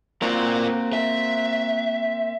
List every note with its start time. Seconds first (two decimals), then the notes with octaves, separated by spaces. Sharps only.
0.22 A#3 C4 F#4 A#4 D5
0.93 E5